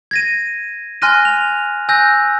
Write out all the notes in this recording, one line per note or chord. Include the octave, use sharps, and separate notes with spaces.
G#6 A#6 D#7
G#5 C6 F6 F#6 A#6 D#7
F7
G#5 E6 F#6 G6 A#6